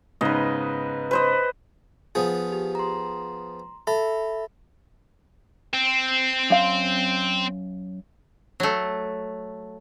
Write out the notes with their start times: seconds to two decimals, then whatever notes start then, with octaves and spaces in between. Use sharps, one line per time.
0.21 G#2 C#3 B3 B4 D#5
1.11 B4 C5 D#5
2.15 F3 B3 G#4
2.52 G4
2.75 A#5 C6
3.87 A4 E5 B5
5.73 C4
6.50 F#2 F5
8.60 F#3 A3